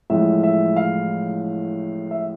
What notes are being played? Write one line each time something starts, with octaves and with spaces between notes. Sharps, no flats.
A1 A2 F3 G#3 E5
E5
F5
E5